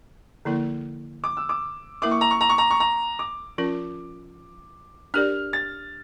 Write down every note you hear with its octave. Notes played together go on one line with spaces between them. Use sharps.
D3 F3 A#3 E4 A#4
D6
E6
D6
A#3 E4 A#4 E5 D6
C#6
A#5
C#6
A#5
C#6
A#5
C#6
A#5
D6
F3 C#4 F4 A#4
D4 G4 A#4 D5 F6
A6